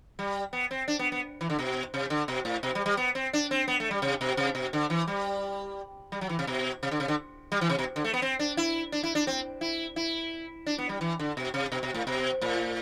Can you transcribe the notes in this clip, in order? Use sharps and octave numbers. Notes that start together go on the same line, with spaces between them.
G3
B3
C4
D4
B3
B3
E3
D3
B2
C3
D3
B2
A2
B2
G3
G3
B3
C4
D4
C4
B3
A3
G3
C3
B2
C3
B2
D3
E3
G3
G3
F#3
E3
C3
B2
C3
D3
C3
D3
G3
E3
C3
B2
D3
A3
B3
C4
D4
E4
D4
E4
D4
C4
E4
E4
D4
B3
G3
E3
D3
B2
C3
B2
B2
A2
B2
A2